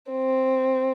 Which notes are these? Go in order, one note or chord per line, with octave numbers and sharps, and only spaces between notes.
C4